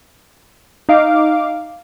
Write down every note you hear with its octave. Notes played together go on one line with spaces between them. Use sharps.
D#4 F5 D6